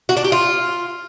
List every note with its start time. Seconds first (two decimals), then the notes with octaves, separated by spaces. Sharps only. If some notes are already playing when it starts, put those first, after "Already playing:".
0.09 F#4
0.17 D4
0.24 G4
0.32 F4